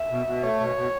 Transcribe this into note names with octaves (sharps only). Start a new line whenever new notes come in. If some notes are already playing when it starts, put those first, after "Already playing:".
Already playing: E5
B2
B2
A3 C#5
B2
B2